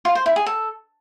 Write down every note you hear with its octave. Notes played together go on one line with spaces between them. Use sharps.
F4
C5
E4
G#4
A4